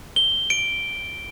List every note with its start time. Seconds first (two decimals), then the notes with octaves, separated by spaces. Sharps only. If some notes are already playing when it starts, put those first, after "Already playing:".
0.16 G7
0.50 D7